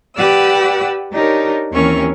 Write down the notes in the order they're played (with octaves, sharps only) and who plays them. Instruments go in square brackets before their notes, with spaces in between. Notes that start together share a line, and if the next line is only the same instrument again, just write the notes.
[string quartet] G4 B4 D5 F#5 E6
D4 D#4 G4 A#4 C#5
D#2 E3 C4 C#4 A#4 C#6